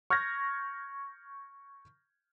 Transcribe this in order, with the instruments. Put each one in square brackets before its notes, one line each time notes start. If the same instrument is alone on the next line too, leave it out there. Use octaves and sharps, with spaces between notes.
[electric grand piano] C#6 F6 G6 G#6 A#6